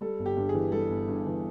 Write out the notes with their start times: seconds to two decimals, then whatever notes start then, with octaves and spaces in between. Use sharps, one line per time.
0.01 G3 A4
0.19 G1
0.26 G4
0.37 G2
0.49 G#4
0.55 E3
0.72 G3 A4
0.90 G1
1.08 G2
1.27 E3